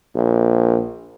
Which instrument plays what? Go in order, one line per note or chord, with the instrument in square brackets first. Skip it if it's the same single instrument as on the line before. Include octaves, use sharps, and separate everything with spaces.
[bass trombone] A#1